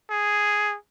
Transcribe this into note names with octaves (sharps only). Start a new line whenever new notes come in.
G#4